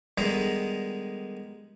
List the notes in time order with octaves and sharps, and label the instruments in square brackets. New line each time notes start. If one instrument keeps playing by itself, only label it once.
[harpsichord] D3 D#3 G3 G#3 B3 D#4